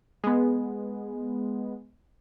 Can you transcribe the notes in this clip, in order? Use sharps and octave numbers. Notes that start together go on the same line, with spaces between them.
G#3 B3